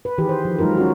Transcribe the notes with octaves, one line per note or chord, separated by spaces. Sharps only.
B4
D#3 E3 G4 G#4 B4
C5
F3
F#3 G#3 D#4 F4 A#4
C#4 F#4